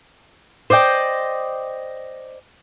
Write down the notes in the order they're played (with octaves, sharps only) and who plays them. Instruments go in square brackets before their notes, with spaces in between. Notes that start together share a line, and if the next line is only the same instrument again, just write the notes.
[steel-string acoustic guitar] C5 D5 D#5 G5